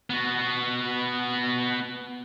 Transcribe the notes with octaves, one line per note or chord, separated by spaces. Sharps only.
B3 F#4